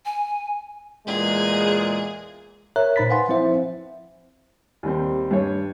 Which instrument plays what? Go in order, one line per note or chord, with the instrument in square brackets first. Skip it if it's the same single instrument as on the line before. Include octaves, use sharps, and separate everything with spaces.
[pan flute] G#5
[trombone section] E2 A#2 G#3 [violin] G#4
[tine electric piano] A#4 C#5 E5 A#5 F#6
A#2 D#4 C5 B5 A6 B6
B4 F5 F#5 G#5 C6
F3 C4 E4 C5 E5
[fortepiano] D#2 G3 C4
G2 C#5